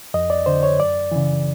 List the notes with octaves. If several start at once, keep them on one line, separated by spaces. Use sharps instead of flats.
F2 D#5
D5
D3 C5
C#5
F#2 D5
C#3 E3